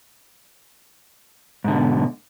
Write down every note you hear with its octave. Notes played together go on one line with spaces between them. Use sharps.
G#2 B2 D3